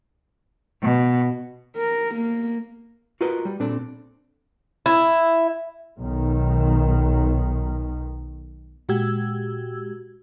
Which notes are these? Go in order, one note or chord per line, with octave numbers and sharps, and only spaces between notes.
B2
A#4
A#3
F4 F#4 A#4 B4 D#5
G3
A#2 C4 D4 A4
E4
B1 D#3
A#2 G#3 F#4 G4 E6 G#6